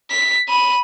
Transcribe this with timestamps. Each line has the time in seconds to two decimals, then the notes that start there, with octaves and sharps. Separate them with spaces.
0.11 B6
0.49 B5 D#7